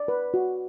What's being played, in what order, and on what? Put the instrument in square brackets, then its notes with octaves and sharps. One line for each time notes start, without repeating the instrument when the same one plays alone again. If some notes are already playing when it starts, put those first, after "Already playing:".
Already playing: [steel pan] D5
B4
F#4